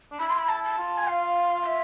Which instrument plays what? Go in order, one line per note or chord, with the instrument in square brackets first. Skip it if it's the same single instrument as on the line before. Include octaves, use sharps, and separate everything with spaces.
[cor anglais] D4
[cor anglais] E4 [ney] B5
[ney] C6
B5
A5
A5
[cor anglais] F4
[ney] G#5
F5
F5
E5